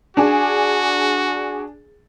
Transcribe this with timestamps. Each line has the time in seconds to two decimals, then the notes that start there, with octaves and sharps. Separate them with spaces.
0.17 D4 F#4 G#4